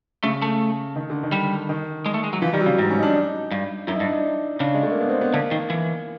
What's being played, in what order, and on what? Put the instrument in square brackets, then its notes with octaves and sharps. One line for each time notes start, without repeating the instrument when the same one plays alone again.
[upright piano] C#3 [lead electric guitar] A3
[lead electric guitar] A3
[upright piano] D#3
D3
D#3
[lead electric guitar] G3
[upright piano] D#3
[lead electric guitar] G#3
A3
G#3
F#3
[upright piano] E3 [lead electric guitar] F3
[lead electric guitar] D#3 [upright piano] G3
[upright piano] F#3
[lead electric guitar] C#3
[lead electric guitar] G#2 [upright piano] G3
[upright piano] C#4
D#4
D4
D#4
[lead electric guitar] G2
[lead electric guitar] F#2 [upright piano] E4
[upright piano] D#4
[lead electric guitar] G2
[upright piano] D4
D#4
D#4
[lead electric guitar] C#3 [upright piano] D4
[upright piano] G#3
A3
A#3
B3
C4
B3
[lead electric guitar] D3 [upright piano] A#3
[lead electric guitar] D#3
E3